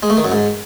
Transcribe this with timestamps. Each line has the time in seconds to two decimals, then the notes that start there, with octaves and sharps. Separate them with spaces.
0.03 G#3
0.10 A3
0.17 D#3
0.24 F#2
0.32 G#2